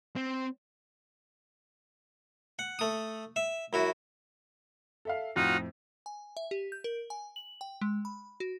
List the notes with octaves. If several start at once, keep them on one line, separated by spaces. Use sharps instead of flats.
C4
F#5
A3 D#6
E5
F#2 E4 F#4
A4 E5 F5
F2 A2 C4 D#4 F4 F#4
G#5
E5
G4
G6
A#4
G#5
F#7
G5
G#3
B5
F#4